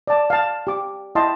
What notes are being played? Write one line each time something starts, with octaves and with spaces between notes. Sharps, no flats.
D5 A5
F5 A5
G4 D6
E4 D#5 E5 G5 A5 C6